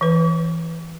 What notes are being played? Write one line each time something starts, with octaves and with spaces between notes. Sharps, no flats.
E3 B4